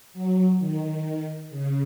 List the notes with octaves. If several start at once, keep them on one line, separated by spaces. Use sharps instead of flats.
F#3
D#3
C#3